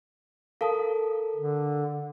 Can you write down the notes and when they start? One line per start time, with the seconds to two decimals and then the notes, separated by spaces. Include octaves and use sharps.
0.61 A4 A#4 F5 A5 D#6
1.36 D3